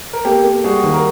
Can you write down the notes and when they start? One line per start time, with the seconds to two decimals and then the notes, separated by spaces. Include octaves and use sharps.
0.13 A#4
0.25 A#3 G4 A4
0.44 A#3
0.64 G3 F#4 G#4
0.84 D#2
0.93 A#4